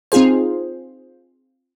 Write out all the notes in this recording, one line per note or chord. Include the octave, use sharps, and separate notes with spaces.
C4 D#4 F4 G#4 C5